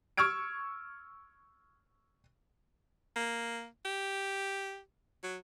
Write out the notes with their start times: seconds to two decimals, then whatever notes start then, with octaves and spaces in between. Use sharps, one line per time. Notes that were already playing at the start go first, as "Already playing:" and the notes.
0.17 C#6 E6 F6 G#6 D7
3.16 A#3
3.85 G4
5.23 F#3